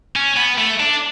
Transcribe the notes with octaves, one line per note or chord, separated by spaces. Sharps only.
C#4
B3
A3
D4